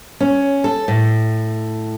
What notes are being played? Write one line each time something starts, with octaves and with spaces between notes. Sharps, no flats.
C#4
A4
A2